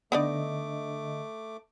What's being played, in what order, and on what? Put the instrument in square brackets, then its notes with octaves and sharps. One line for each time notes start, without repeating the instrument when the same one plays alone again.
[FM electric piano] D3 D#5 [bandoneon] A3 D6 [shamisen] B3 D#4 D5